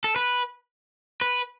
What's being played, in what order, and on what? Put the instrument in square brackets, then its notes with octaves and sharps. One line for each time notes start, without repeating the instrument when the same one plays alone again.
[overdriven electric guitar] A4
B4
B4